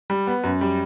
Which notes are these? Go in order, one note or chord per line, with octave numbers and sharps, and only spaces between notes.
G3
B3
F#2
G3